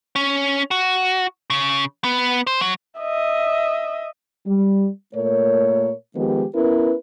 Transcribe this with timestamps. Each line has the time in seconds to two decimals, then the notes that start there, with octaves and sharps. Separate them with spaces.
0.16 C#4
0.71 F#4
1.50 C#3
2.04 B3
2.47 C5
2.61 F#3
3.00 D#5 E5
4.47 G3
5.15 A#2 A3 A#4 C#5
6.16 D#3 F3 G#3 B3 G4
6.55 B3 C#4 E4 A#4 B4